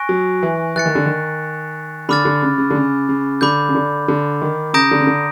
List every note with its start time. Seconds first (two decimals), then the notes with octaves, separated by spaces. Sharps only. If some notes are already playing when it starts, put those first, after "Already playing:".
Already playing: G#5 C#6 F#6 A#6 D7
0.09 F#3
0.43 E3
0.76 E3 F#6 A6 C#7
0.85 D#3
0.95 D3
1.06 D#3
2.09 D3 B5 D6 F6 A6
2.25 D3
2.42 C#3
2.58 C#3
2.70 D3
2.75 C#3
3.09 C#3
3.41 D3 B5 D6 G6
3.69 C#3
3.75 D3
4.08 D3
4.42 D#3
4.74 C#3 A#5 D#6 G6 A#6 D7
4.91 D3
5.01 C#3
5.07 D3